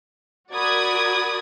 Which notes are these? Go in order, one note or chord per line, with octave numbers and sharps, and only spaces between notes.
F#4 A#4 D5 B5 D#6 G#6